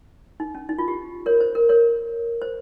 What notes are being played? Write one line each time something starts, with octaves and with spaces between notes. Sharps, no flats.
D#4
C#4
D#4
F4
G4
A#4 C#5
C5
A#4
A#4 C#5
C5